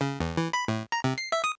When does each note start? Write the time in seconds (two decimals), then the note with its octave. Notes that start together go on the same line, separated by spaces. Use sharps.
0.01 C#3
0.20 E2
0.37 E3
0.53 B5
0.68 A2
0.92 A#5
1.04 C3
1.18 C7
1.32 E5
1.44 D#6